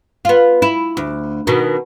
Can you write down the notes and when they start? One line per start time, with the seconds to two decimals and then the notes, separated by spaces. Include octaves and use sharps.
0.25 B3 F4
0.62 E4
0.97 D2
1.47 B2 D#3